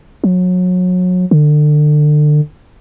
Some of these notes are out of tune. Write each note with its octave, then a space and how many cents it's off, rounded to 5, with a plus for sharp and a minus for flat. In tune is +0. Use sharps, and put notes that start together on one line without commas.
F#3 -30
D3 +30